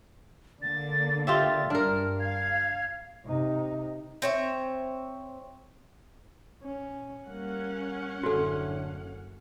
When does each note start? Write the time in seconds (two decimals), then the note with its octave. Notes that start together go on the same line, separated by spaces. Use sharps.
0.62 D3 A#3 A6
1.27 F4 G4 E5 A6
1.70 G2 D4 A#4 F6
2.20 F5 G#6
3.25 C3 D#4
4.22 C4 C#5 E5
6.63 C#4
7.28 G3 A#3 C#4 F#5
8.23 F#1 A2 D3 F#4 A4